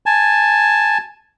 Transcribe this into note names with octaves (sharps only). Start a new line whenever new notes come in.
G#5 A5